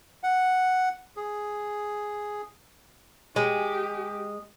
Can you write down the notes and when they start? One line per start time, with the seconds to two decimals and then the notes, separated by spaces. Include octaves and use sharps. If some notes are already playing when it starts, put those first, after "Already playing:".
0.24 F#5
1.17 G#4
3.36 G#3 G4